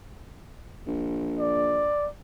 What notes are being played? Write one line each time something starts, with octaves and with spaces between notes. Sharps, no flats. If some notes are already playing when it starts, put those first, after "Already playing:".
A#1
D5